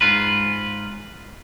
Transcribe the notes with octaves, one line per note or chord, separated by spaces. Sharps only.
G#2 F4 B4